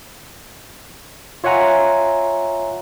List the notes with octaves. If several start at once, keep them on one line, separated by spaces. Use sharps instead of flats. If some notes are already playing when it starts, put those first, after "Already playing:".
F4 C#5 E5 F#5 G#5 A#5